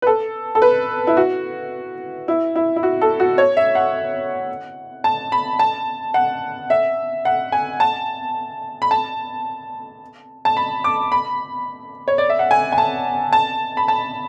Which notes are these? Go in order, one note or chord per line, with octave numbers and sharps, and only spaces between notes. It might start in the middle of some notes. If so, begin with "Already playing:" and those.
B4
A4
A4
B4
E4
F#4
E4
E4
E4
F#4
A4
F#4
C#5
E5
F#5
A5
B5
A5
F#5
E5
F#5
G#5
A5
B5
A5
A5
B5
D6
B5
C#5
D5
E5
F#5
G#5
G#5
A5
A5
B5
A5